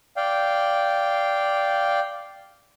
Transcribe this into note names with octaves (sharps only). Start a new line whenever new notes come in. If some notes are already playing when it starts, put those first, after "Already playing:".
D5 F5 G5